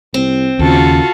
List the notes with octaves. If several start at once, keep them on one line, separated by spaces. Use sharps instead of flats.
C2 C4
D#2 C#3 F4 F#4 A4